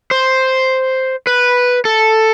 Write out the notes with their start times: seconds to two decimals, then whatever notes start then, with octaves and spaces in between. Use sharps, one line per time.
0.11 C5
1.27 B4
1.85 A4